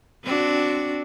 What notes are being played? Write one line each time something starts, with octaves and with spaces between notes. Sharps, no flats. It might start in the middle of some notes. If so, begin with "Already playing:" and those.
C4 D4 F#4